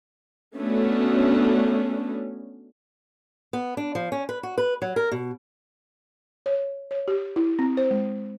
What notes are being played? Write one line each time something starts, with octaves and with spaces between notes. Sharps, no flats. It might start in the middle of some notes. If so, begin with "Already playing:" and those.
A3 B3 C#4 D4 F#4
B3
D4
F3
C#4
B4
F#4
B4
F#3
A#4
B2
C#5
C#5
G4
E4
C4
C5
G#3